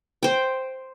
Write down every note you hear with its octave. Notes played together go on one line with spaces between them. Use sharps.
C5 G5